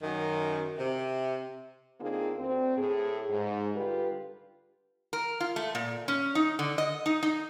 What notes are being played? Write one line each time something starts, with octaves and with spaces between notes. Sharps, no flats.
F#2 D#3
C3
D3 A#3 C4 D#4 F4 G#4
D2 C4
A2 G#4
G#2
D3 G3 F4 G4 B4
A#4
F4
A3
A#2
C#4
D#4
D3
D#5
D#4
D#4